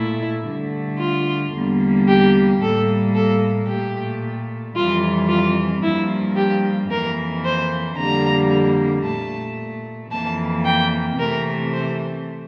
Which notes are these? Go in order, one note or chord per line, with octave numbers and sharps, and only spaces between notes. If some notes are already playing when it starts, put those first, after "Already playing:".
Already playing: A#2 A3 E4
G2 D3 A3
F4
E2 D3 G3 A#3
G4
A2 G3 A#3 A4
A4
A#2 A3 G4
F2 E3 G3 F4
F4
G2 F3 A#3 E4
G4
F2 E3 A#3 A#4
C5
F2 D3 G3 A#3 A#5
A#2 A3 A5
F2 E3 A#3 A5
G5
C3 E3 A3 A#4
C5